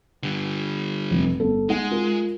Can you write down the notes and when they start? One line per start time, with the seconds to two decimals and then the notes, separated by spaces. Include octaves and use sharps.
0.23 D3 G3
1.11 F1
1.40 G1 A4
1.69 G#3 D#4 F#5
1.91 F4 A#4